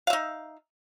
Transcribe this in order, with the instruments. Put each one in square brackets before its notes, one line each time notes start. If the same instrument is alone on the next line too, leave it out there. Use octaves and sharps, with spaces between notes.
[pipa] F5
E5
D#4